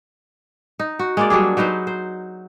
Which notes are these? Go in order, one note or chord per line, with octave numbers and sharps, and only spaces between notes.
D#4
F#4
G#3 A#3 D5
F#3 G3 D4 G#4
F#3 D#4 B4 C5
C5